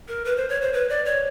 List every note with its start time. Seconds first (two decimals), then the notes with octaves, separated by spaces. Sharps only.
0.08 A#4
0.25 B4
0.37 C5
0.49 C#5
0.62 C5
0.73 B4
0.89 D5
1.05 C#5